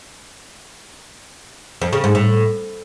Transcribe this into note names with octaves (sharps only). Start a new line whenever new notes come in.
F2
C#3
G#2
A2